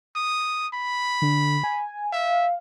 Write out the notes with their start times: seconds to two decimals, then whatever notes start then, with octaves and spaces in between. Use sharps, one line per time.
0.15 D#6
0.74 B5
1.22 D3
1.64 G#5
2.12 E5 F5